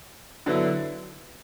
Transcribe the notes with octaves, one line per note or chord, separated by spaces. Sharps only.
D3 F#3 B3 E4